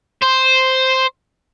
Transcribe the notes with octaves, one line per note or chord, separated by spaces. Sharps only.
C5